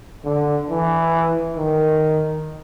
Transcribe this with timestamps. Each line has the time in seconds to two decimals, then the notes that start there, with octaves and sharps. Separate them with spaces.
0.24 D3
0.69 E3
1.56 D#3